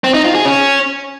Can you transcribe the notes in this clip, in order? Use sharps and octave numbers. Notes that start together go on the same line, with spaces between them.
C4
D#4
F4
G#4
C#4